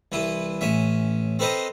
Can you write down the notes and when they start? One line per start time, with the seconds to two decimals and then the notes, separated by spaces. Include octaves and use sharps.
0.12 C2 E3 E4
0.61 A1 C#4 E5
1.39 C4 A4 B4 C5 D#5 A#5